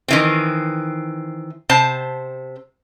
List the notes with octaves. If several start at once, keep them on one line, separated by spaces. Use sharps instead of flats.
D#3 E3 C4
C3 C5 A5